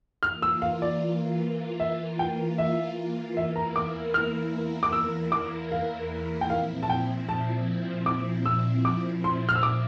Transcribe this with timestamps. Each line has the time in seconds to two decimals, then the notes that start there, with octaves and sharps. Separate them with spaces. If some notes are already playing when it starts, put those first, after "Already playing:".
0.23 E3 A#3 F4 F6
0.42 E6
0.62 F5
0.82 D5
1.80 E5
2.19 G5
2.58 E5
3.37 E2 E3 A#3 E4 A#4 E5
3.56 A#5
3.76 D6
4.14 F6
4.83 D6
4.92 E6
5.32 D6
5.72 F5
6.41 G5
6.50 A#2 F3 C4 E4 F5
6.83 A5
6.89 G5
7.29 A5
8.06 D6
8.46 E6
8.85 D6
9.24 C6
9.49 F6
9.55 E6
9.63 D6